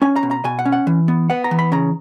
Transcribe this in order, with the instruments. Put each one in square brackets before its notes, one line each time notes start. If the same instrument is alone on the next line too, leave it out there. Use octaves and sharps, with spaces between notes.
[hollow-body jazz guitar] C#4 G#5
A#5
B2
A#5
B2 G#5
F#5
C#4
F#5
E3
B3
B3 F#5
A#5
E3
B5
C#3 A#5